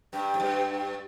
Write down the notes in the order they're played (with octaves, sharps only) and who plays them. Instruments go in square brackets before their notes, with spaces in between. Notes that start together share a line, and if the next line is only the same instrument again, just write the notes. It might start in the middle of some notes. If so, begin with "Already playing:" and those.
[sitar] G2 [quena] G5
[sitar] G#2
G2